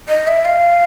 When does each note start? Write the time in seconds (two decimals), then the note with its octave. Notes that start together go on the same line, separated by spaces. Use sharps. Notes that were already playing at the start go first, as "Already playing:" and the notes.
0.09 D#5
0.27 E5
0.45 F5